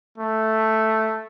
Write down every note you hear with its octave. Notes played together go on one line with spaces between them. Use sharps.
A3